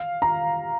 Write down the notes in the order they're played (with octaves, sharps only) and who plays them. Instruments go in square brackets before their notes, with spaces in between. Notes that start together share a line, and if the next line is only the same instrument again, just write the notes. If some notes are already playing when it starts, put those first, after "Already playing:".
Already playing: [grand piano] F5
A#5